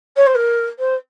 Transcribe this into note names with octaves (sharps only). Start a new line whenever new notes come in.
C#5
C5
A#4
C5